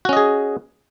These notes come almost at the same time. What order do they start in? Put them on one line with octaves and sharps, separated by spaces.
F#4 C#4 D#5 G#4